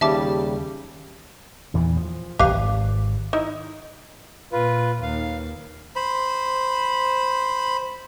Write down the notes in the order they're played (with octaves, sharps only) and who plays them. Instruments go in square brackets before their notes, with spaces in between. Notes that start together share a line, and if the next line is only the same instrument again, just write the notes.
[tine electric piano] D#2 C#3 G3 [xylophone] E5 A5 D6
[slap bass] E2 A#2 E3
F3
[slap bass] D#1 G#1 [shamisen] G4 B4 F5
[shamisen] D#4 E4
[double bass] A#2 [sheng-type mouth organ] F4 B4
[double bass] D#2 [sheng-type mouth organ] F5
[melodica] C5 B5